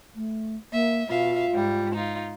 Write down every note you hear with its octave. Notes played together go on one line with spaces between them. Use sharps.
A3
A#3 E5
B2 F4 E5 F5
G#2 G3
D#4 F4